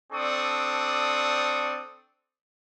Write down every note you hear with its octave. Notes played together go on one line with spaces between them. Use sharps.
C4 D4 A4 D5 C#6 D#6